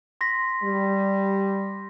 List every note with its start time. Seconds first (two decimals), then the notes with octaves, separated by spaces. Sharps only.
0.21 C6 A#6 B6
0.62 G3